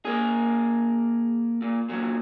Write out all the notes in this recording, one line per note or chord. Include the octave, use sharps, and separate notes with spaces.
A#3 G#4
A#2
A#2 F#3